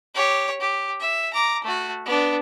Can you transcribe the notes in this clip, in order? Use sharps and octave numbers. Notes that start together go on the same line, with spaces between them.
G4 C#5
G4
E5
A#5 D6
A3 F#4
B3 D4